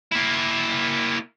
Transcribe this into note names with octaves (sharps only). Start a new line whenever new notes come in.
A#3 E4